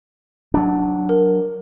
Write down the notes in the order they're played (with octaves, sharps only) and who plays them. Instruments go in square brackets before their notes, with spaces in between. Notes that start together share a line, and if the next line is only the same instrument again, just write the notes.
[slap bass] F#3 D4
[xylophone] A#4